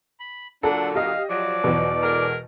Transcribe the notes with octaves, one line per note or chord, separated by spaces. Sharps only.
B5
A#2 D3 F#3 D4 A4 F#5
G4 D#5 F5
F3 F#3 D5
E2 B2
G#3 A4 A#4